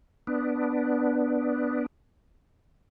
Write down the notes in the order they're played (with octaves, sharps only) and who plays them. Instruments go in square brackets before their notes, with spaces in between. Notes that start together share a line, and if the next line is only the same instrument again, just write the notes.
[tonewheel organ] B3 D4